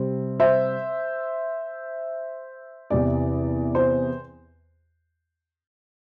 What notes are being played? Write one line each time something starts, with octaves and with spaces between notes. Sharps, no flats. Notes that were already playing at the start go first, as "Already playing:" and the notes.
Already playing: C3 G3 C4
C5 E5
E2 C3 E3 D5
C5